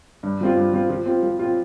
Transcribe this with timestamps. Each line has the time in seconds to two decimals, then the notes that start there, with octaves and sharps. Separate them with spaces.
0.23 G2
0.41 F3 C4 F4
0.57 G2
0.73 F3 C4 F4
0.90 F3
1.06 C4 F4
1.23 F3
1.39 C4 F4